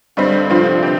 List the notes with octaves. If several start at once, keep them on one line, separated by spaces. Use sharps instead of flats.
G2 D3 G3 C4
G2 C3 F3 C4 F4
C4 G4